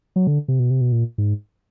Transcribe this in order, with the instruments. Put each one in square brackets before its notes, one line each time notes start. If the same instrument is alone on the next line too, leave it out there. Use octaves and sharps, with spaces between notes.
[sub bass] F#3
D3
C3
B2
C3
B2
A#2
G#2